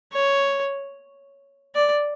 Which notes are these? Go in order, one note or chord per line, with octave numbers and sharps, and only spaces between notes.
C#5
D5